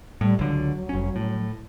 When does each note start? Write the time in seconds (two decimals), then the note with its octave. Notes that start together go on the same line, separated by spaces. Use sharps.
0.21 A2 G3
0.39 C#2 D3 F#3
0.89 F1 C#4
1.16 A2